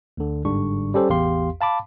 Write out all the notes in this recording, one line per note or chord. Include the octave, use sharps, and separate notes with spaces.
D2 D3
G1 G#2 D3 G3 D4 C#6
G3 C#4 G4 A4 C5
A1 E2 G4 F5 C6
F5 A5 B5 D6